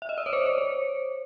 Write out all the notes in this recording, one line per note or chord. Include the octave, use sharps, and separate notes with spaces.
E5
D#5
D5
C#5
C5
C#5
C5